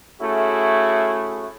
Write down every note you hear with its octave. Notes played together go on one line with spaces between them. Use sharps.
A3 C#4 E4 F#4 G#4